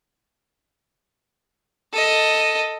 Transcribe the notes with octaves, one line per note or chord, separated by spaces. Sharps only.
A4 D#5